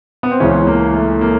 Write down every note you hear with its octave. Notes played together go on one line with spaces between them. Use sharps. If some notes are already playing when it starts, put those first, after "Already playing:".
B3
C4
C#2 C#3 E3 C#4
A#3
A3
A#3